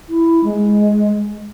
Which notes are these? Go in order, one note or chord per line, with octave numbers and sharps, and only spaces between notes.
E4
G#3